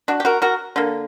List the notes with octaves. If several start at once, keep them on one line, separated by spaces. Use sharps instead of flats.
D4 F#4
G4
F#4 A#4
F#4 A#4
D3 A#3